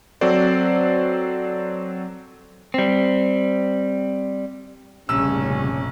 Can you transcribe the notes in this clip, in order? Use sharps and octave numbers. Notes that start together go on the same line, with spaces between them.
F#3 C4 F#4 A4 C5 D5
G3 C4
F1 A#1 A#2 C#3 G3 C#4 E6